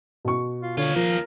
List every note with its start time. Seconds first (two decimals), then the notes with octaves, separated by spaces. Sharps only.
0.25 B2 C#6
0.61 F4
0.77 D#2 D3 F4 C#5
0.96 F3 A#4